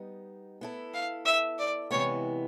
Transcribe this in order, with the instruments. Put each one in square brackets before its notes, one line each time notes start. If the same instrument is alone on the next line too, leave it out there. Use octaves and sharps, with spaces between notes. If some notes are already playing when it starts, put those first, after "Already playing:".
Already playing: [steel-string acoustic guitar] G3 B3 D#4
B3 E4 A4
[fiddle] F5
E5
D5
[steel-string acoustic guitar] C3 E3 G#3 B3 [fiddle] C#5